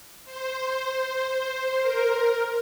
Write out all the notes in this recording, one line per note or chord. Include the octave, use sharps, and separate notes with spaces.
C5
A#4